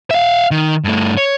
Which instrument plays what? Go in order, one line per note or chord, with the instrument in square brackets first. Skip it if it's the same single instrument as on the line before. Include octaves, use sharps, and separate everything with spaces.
[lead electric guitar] E5 F5
D#3
G2 A3
C#5